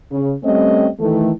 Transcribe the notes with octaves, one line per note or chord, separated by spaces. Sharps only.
C#3
G3 A3 C4 C#4 D#5
D#3 E3 A3